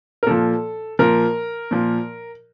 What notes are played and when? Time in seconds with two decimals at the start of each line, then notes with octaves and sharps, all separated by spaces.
0.23 A#4
0.27 A#2 F3 A4
0.99 A#2 F3 A#4
1.71 A#2 F3